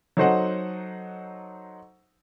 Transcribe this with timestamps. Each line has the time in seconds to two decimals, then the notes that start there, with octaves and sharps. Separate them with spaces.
0.17 F#3 D#4 A4 C5 D#5 F#5